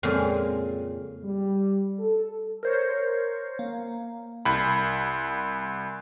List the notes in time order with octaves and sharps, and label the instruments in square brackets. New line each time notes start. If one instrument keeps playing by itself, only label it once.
[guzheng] F2 A#2 C#3 G#3 A#4
[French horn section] G3
A4
[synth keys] A#4 C5 C#5
A#3
[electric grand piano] C2 B5